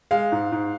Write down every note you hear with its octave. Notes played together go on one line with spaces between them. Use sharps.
G#3 F5
G#2
G#2